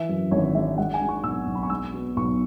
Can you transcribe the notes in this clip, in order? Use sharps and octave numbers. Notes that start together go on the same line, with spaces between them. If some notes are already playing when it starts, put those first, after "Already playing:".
Already playing: E3 E5
F#2
G#1 C#5
C#5
G#3 E5
G#3 F#5
G#5
G#3
C#6
B1 E6
B1
B5
C#6
G#3 E6
B2
B1 C#6